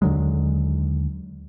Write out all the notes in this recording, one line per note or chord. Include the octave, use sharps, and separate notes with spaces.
D#2 D3 F#3 G#3